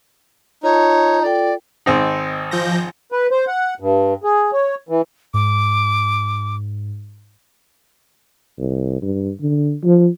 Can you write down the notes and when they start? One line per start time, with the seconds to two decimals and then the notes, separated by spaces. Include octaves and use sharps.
0.63 D#4 F4 C#5 A5
1.22 F4 A4 D5 G5
1.86 G#1 C4 D#4
2.51 F3 G6 A#6
3.12 B4
3.31 C5
3.47 F#5
3.80 G2
4.24 G#4
4.53 C#5
4.89 E3
5.34 G#2 D6
8.59 C2
9.02 G2
9.41 D3
9.84 F3